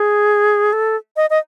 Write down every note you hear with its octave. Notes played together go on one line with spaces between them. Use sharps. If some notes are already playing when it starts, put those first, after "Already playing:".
Already playing: G#4
A4
D#5
D#5